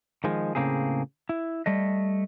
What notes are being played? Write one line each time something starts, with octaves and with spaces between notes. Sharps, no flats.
D#3 F3 G#3
A2 C#3 A3 A#3 C4 G#4
E4
G3 A3 D#5